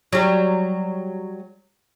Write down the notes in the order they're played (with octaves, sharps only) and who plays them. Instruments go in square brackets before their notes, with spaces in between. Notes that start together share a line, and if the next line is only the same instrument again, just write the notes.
[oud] F#3 G3